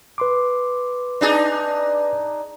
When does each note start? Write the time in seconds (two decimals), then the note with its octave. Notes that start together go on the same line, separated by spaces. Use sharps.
0.18 B4 C6 D6
1.21 D4 D#4 G#4